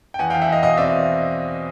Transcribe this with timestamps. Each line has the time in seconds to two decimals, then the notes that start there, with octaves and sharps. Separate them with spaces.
0.14 G5
0.19 E2 F#5 G#5
0.30 E2 F5 G5
0.42 E5 F#5
0.49 E2 D#5 F5
0.63 B2 D#5 F5
0.78 C4 D5 E5